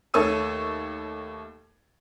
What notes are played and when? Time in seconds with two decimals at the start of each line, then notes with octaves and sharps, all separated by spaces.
0.14 D#2 A3 A4 C#5 E6 D#7